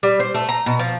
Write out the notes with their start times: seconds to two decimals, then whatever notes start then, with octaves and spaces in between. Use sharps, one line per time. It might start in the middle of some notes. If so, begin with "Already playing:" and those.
0.03 G3
0.20 C5
0.34 A3
0.49 A#5
0.66 B2
0.79 F3